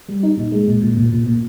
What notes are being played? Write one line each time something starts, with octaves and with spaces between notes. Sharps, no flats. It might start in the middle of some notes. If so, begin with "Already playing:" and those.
G3
D#4
A#2
G#3
A#2
A#2
A#2
A#2
A#2